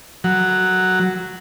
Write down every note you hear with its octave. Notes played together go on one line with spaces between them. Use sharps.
F#3